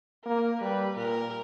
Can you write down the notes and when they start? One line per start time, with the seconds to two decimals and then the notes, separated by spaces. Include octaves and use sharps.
0.25 A#3 A#4
0.61 G3 B4
0.96 A#2 A#4